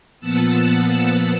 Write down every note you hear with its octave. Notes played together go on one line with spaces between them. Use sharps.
A#2 F3 B3 F#5 A5 E6